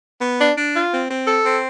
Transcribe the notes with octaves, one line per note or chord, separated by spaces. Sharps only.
B3
D4
D4
F4
C4
C4
A4
C4